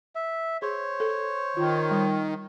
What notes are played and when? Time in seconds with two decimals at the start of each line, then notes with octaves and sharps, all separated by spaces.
0.15 E5
0.62 G#4 C5 C#5
1.00 A4
1.57 D#3 F4
1.91 G3